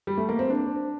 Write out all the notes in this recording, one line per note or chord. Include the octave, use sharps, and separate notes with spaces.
G3
A3
A#3
C4
D4